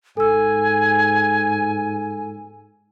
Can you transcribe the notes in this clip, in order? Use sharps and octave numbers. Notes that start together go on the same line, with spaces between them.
G#2 A4 G#5 E6